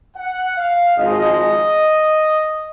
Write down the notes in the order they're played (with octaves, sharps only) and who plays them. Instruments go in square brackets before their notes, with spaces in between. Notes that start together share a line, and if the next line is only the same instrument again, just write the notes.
[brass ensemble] F#5
F5
G#1 G#2 F3 G#3 D#4 D#5